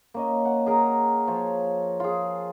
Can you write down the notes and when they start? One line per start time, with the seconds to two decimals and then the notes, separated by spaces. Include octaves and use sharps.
0.14 A#3 C#4 D#5
0.45 F#5
0.66 G#4 A#4 A#5
1.27 F3 F4 C#5
2.00 F4 G#4